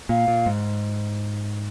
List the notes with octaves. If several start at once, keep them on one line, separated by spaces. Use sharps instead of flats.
A#2 F5
A#2
G#2